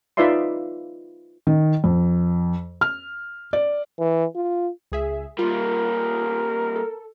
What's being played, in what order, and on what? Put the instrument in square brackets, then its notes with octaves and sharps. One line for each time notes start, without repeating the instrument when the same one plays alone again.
[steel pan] D#4 F4 B4 D5 E5 C6
[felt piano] D#3
F2
F6
D5
[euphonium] E3
F4
[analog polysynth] C#2 G#4 E5
[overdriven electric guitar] G3 A#3 [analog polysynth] F4 [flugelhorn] A#4
[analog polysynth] A4